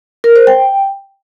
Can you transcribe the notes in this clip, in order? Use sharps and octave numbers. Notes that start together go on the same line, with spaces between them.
A#4
C5
G5